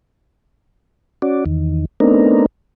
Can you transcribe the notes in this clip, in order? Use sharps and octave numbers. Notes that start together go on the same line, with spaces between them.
C#4 F#4 D5
E2 D#3
A3 B3 C4 D4 D#4 A#4